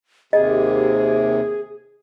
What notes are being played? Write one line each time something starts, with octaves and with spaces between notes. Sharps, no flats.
D#2 C3 G#4 D#5